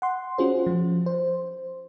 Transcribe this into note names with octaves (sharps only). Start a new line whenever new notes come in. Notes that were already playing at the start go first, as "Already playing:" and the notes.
F#5 C6
C#4 F4 F#4 G#4 C5
F3
C5